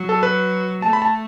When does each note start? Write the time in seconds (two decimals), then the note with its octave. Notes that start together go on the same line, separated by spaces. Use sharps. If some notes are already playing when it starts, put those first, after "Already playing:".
Already playing: F#3
0.09 A4
0.23 B4
0.82 A3 A5
0.93 B5
1.02 A5